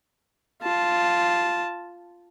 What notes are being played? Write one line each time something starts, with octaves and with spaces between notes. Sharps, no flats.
F4 A5